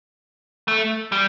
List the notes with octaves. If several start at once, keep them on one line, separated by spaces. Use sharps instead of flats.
A3
G3